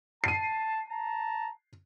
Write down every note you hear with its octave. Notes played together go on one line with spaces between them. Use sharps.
A5 C7 D#7
A5 A#5